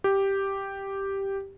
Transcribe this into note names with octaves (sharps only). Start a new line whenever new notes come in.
G4